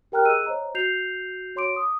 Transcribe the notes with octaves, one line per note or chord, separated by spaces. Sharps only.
G4 A#4 G5 A#5 F6 F#6
G#4 D#5 E6 F#6 D#7
C5 C#5 D#5 A#5
F#4 G6 C7 F7
F#4 C#5 C6 D6 D7
D6 D#6